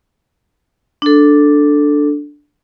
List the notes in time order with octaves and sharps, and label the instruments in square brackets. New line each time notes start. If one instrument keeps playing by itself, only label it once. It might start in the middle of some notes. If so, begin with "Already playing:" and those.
[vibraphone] D4 A4